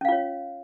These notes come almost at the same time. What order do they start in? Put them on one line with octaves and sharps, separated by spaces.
C#4 F5 F4 C#5